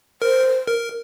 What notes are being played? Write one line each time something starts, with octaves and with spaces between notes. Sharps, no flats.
A#4 C5
A#4